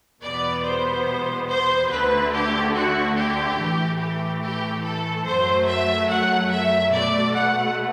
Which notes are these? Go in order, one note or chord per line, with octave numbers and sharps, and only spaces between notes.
E2 B2 G3 B3 D5
C5
C5
D2 D3 A3 B4
G4
F#4
G4
A2 E3 A3
G4
G4
A4
F#2 F#3 A3 C5
E5
F#5
E5
B2 A3 D5
F#5